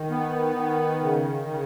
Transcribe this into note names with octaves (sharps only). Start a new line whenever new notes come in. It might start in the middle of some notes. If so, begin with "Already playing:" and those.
Already playing: D#3
B3
D#3
C#3
C#3